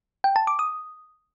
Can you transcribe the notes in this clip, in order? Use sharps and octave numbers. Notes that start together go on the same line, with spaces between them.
G5
A5
D6
D#6